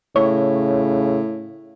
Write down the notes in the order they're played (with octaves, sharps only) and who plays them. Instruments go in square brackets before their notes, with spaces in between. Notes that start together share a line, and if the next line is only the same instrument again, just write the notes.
[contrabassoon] A2 [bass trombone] C#3 [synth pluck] C#5